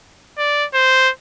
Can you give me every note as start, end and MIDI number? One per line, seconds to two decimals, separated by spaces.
0.38 0.65 74
0.74 1.10 72